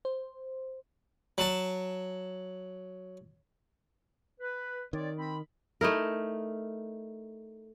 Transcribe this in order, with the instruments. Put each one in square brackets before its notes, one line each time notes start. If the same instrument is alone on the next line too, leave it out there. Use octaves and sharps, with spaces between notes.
[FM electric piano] C5
[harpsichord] F#3 A5
[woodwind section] B4
[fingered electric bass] D#3 [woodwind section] C4 C#5 D5
[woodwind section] C4 B5
[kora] A3 D#4 E4 A#4